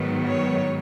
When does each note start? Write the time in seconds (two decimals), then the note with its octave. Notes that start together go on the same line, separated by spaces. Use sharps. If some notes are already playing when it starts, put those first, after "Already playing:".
Already playing: G#2 D#3 F#3 B3
0.28 C#5